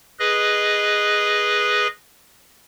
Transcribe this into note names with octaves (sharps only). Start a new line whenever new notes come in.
G#4 B4 D#5